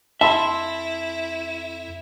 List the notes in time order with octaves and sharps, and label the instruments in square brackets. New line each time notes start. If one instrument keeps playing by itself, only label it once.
[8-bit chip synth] F2 [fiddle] E4 [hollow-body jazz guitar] E5 [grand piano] A5 B5 C6